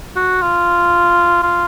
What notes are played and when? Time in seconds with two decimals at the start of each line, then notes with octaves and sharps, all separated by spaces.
0.16 F#4
0.42 F4
1.43 F4